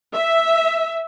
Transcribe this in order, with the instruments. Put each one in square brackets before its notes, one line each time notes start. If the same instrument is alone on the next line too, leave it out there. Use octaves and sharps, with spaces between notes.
[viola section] E5